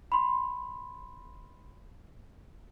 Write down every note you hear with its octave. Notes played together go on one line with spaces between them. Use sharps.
B5 C6